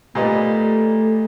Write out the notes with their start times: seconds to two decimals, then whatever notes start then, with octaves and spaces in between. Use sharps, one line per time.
0.15 A#2 G3 A3 B3 D#4